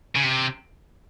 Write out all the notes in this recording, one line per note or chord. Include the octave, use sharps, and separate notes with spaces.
C#3
C3